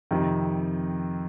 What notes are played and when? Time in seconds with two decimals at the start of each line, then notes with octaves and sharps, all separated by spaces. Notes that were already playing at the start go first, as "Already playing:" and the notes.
0.11 F2 C3 D#3